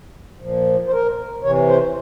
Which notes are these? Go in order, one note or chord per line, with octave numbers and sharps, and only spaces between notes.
A#2 F3
C5
A#4
C3 E3 C#5
C5